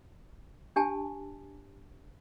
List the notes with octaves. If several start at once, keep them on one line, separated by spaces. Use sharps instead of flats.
D4 G4 G#5 A5